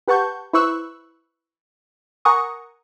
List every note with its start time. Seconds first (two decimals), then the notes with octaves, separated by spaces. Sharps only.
0.08 G4 B4 F#5 A5 C#6 G6
0.53 E4 B4 C5 C#6 E6 F#6
2.25 A#4 F#5 G#5 A#5 C#6 D#6